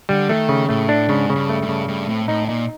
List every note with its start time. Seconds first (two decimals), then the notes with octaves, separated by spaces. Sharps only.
0.09 D3 G3
0.29 D#3 A3
0.49 C#3
0.69 A2 A3
0.89 D4
1.09 G#2 C#3
1.30 C#3
1.36 G2
1.49 A3
1.62 G2
1.69 C#3
1.88 G2 A3
2.09 A2 C4
2.28 A2 D#4
2.48 A#2 D#4